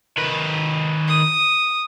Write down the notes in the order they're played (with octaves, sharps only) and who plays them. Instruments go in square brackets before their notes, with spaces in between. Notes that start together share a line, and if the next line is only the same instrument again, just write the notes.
[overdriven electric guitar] D#3 B4
[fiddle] D#6